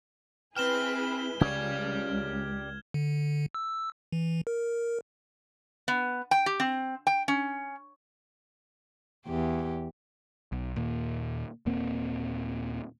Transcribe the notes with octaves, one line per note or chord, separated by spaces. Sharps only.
C4 E4 G#4 B4 G5 F6 E7 G7
C#2 C#3 C#4 G4 D5 G#6
D3
E6
E3
A#4
B3
G5
G4
C4
G5
C#4
E2 G4
B1
D#2 A#2 A#3
D#1 A#2 A#3 C4